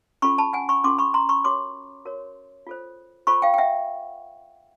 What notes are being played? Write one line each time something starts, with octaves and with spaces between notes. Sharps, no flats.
C#4 F4 A4 B5 C#6
A5 B5
F#5 G#5
B5 C#6
C#4 F4 A4 C6 D6
B5 C#6
A#5 C6
B5 C#6
F#4 A#4 C#5 C6 D6
F#4 A#4 C#5
F4 A4 C5
F4 A4 C5 B5 C#6
F5 G5
G5
E5 F#5